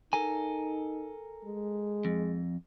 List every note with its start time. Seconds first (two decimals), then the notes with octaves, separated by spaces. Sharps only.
0.13 D#4 A4 A#4 G#5
1.45 G#3
2.05 F2